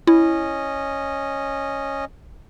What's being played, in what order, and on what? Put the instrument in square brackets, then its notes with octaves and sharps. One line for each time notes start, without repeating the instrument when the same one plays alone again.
[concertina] C#4 D#5 [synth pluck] E4